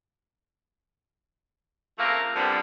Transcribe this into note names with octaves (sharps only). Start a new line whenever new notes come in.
C#3 F3 A3 A#3 C4 A#4
F2 D3 F3 G3 B3 C4